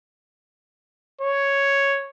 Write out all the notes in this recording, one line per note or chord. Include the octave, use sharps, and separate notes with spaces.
C#5